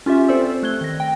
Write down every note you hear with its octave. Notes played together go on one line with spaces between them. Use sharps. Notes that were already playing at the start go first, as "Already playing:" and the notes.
C#4 F4 G4 E5
C4 A4 C5 D5 E6
A3 F#6 G#6 G7
D#3 A#6
G5